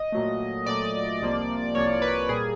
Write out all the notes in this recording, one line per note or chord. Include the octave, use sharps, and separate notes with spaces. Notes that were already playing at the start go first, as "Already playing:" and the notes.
Already playing: D#5
A#2 F#3 A3
A#2 F#3 A3 D5
C2 C3 F3 A#3
C2 C3 F3 A#3 C#5
B4
A#2 G3 A#3 G#4